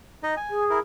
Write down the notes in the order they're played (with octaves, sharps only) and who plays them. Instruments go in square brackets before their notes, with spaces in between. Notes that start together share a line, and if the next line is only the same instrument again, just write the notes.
[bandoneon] D#4 D#5
G#5
[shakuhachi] G#4
[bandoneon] E4 A#4